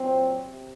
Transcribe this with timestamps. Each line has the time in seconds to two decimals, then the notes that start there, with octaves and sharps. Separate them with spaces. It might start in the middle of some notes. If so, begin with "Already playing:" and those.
Already playing: A#2 F#3 C4
0.45 C3